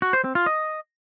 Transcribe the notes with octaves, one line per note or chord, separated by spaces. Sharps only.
F#4
C5
C4
F4
D#5